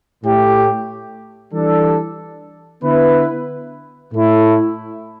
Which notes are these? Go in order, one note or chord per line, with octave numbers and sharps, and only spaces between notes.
A2 A3 G4
E3 G3 D4 A4
D3 B3 E4 B4
A2 A3 E4